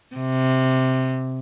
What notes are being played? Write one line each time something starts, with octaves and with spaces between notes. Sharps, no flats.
C3